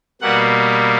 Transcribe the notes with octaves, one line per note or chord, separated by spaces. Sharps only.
B2 G3 A#3 F#5